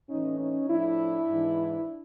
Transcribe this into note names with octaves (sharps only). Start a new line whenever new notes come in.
A2 E3 C#4 D#4
C#4 D#4
A2 F3 D4 E4
G#2 E3